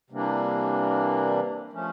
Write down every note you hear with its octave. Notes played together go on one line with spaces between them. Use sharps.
C3 E3 G3 A#3 D4
F3 A3 C#4